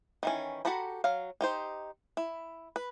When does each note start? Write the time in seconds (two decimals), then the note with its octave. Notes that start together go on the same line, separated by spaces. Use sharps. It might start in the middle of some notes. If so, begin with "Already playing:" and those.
0.23 D#3 E3 C#4
0.65 F#4 G4 A4 A#5 B5
1.04 F#3 F5
1.41 D#4 G4 C5
2.17 E4
2.76 B4